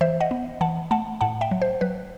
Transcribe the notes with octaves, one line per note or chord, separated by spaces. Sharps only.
E3 C5 E5
D#5 F#5
B3
E3 F#5 A5
A3 F#5 A5
A2 F#5 A5
E5 G5
F#3
C5
F#3 B4